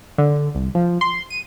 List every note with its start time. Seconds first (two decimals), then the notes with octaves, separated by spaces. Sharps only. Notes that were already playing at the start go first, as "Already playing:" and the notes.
0.18 D3
0.55 C2
0.75 F3
1.01 C6
1.30 D#7